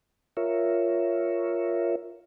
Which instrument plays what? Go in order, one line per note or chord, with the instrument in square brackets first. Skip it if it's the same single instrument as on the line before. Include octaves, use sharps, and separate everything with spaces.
[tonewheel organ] F4 A#4 C#5 E5